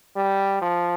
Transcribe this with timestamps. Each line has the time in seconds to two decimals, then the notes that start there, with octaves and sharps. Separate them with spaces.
0.16 G3
0.61 F3